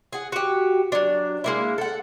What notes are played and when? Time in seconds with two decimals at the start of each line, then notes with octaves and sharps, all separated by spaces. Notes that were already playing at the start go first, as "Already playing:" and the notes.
0.13 G#4 F#5
0.32 F#4 G4
0.92 F#3 D4
1.44 G#3 A#3 E4
1.78 A4 F#5